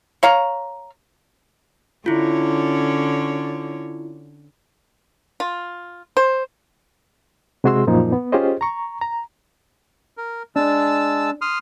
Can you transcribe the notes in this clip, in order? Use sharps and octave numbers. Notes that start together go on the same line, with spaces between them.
C#5 F5 A#5
D3 C#4 E4 F4 C#5
F4
C5
C3 G#3 F#4 G#4 C6 E6
F#2 A#2 F3 A#3 D#4
B3
C#4 F4 G4 G#4 C5 D#5
A#5 C#6
A#5
A#4
G#3 D4 A5 E6
C6 D#6 F6